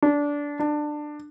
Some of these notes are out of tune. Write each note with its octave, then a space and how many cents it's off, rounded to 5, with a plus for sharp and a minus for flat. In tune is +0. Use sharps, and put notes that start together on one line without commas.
D4 -15
D4 +20